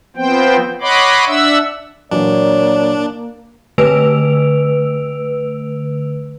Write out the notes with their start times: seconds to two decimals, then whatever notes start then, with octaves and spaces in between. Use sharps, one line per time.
0.17 F3 B3 C4 C5 G5
0.81 C#5 D#5 F#5 B5 C6 D6
1.27 D4 E5 F#5 E6
2.11 A#2 E3 F#3 A#3 D4 C#5 D5
3.78 D3 A3 B4 E6 D7 F7